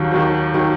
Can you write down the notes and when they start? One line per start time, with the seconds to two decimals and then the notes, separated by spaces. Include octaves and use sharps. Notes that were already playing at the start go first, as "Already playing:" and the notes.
Already playing: D#2 D#3 F#3
0.12 D#2 D#3 F#3
0.54 D#3 F#3